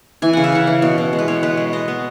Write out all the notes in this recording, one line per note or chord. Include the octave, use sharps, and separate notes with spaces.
E3 G#5
C#3 F#5
E5
E3 F#5
E3
B2
B2
G#3
B4
B2 C#5
G#3 B4
G#3
B3 D#5
B3